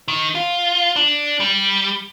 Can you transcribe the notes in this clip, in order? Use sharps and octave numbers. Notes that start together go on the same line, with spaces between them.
D#3
F4
D4
G3